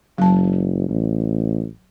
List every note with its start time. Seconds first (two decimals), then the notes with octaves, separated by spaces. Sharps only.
0.18 F#1 F#3 A5
0.89 A1